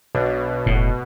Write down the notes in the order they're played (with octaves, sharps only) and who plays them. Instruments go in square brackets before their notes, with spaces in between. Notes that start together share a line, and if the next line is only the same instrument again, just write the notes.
[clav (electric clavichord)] B1 D4 [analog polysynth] B2
[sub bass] F1 [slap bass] A2